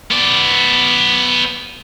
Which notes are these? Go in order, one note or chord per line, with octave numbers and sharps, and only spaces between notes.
B3 D5